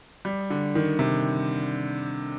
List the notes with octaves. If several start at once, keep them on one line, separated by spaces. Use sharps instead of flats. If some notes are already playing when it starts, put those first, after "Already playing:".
G3
D3
D#3
C3